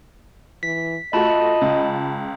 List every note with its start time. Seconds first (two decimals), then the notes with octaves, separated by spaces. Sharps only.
0.63 E3 B6
1.13 A3 F4 F#4 D#5 A5 B5
1.61 C#2